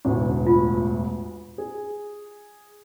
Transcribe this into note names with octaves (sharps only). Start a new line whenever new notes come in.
E1 A1 D2
F4
G#4